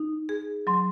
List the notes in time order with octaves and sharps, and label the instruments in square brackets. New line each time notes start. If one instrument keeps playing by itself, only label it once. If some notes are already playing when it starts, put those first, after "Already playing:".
Already playing: [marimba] D#4
G#4
[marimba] F#3 [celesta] C6